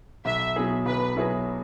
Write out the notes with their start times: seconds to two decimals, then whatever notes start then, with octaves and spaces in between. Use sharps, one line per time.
0.25 B1 E5
0.56 B2 F#3 E4 G#4
0.86 B1 B4
1.16 B2 F#3 E4 G#4